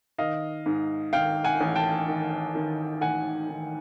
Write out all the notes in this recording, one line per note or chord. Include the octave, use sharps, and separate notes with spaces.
D#3 D#5 F5
G#2
D#3 F5 G5
F#5 G#5
A1
G5 A5
D#3
D#3
A1 F#5 G#5
D#3